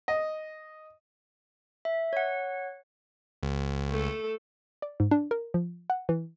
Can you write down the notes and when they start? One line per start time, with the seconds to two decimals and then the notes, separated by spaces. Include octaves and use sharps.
0.08 D#5
1.85 E5
2.13 C#5 F#5
3.43 C#2
3.90 A3 A4
4.82 D5
5.00 G#2
5.11 D4
5.31 A#4
5.54 F3
5.90 F#5
6.09 E3